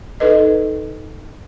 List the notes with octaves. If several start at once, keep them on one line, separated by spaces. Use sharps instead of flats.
D#4 A4 B4 D#5